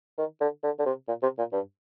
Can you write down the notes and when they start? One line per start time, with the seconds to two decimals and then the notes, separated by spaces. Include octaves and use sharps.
0.18 D#3
0.41 D3
0.63 D3
0.79 D3
0.86 C3
1.08 A#2
1.23 C3
1.38 A#2
1.53 G2